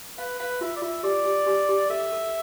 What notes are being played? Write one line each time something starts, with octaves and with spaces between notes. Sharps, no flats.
B4 F5
B4 F5
F4 E5
D5
F4 E5
G4 D5
G4
G4
G4
A4 E5
A4